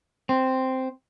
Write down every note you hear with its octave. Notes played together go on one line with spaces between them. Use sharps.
C4